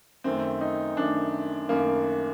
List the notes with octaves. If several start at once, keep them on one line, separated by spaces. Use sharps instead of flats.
F#2 D#3 A3 C4
D#4
F#2 D#3 A3 D4
F#2 D#3 A3 A#3